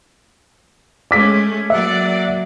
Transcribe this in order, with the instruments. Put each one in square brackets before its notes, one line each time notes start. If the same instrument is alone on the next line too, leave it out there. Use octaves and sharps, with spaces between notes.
[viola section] G#3 A3 C#4 [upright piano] D6 B6
[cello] F#3 A#3 [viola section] D5 F#5 [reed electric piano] E5